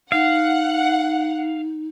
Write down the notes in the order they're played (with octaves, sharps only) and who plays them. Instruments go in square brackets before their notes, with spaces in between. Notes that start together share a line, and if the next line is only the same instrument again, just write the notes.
[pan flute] D#4 [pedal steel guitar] F5 [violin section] F#5